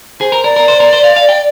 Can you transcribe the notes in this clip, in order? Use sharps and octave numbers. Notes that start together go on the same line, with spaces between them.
G#4 C5
A#4
A#4 D5
A#4
C5
A#4
C5
F5
F5
G5